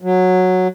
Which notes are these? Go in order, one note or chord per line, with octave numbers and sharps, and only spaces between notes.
F#3